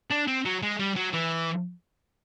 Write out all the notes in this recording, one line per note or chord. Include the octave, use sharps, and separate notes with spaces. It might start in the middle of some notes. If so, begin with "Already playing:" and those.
D4
C4
F#3
G#3
G3
F#3
E3